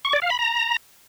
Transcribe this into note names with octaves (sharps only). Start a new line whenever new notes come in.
C#6
D5
F5
B5
A#5